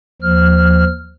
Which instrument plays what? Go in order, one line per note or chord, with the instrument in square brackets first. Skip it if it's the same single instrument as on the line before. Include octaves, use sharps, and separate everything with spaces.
[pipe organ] D#2 F3 F6